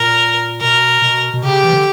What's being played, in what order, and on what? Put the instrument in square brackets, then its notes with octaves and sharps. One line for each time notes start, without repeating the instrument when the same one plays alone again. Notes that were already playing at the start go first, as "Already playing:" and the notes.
Already playing: [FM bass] A#2 [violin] A#4
[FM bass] B2 [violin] A#4
[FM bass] B2
B2
[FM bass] C#3 [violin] G4
[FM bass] E3
D3